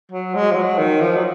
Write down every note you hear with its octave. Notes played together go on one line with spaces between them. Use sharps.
F#3
G#3
F3
F#3
D#3
F3
F#3